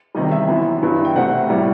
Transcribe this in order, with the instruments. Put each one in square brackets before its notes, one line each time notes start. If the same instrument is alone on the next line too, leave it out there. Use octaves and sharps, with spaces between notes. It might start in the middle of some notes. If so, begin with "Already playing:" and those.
[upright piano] E2 C3 D#3 G3 D#5
E5
F#2 E3 B3
G2 E3 B3
G5
C2 B2 A3 C4 F#5
A2 G3 B3